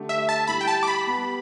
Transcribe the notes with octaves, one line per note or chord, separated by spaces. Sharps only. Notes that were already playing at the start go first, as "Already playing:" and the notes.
Already playing: D3 A3 G4
E5
A5
G3 E4 G4 B5
G5
A5
D6
B5
G3 B3 G4